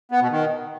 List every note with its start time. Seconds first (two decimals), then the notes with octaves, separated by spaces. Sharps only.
0.11 B3
0.21 B2
0.31 D#3